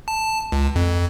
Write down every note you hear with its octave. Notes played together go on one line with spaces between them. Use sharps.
A5
C#2
F2